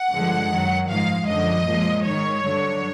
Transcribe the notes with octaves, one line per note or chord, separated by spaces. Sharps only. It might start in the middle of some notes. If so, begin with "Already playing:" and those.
Already playing: F#5
G2 D3 F3 G#3
F#2 D#3 F#3
G#2 F3 G#3 F5
F#2 D3 F3 D#5
A#2 F3 G#3
G#2 D#3 G#3 C#5
G2 D3 F#3